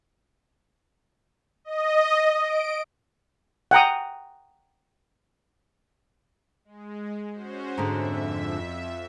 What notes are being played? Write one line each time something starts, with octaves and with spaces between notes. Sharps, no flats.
D#5
D7
F#5 G5 A#5 D#6
G#3
C#4 F#4 C5
F2 G#2 D3 E5